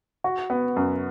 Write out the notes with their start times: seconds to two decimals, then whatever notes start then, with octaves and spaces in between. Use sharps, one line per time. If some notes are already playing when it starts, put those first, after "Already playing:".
0.24 F#4
0.50 B3
0.76 F#2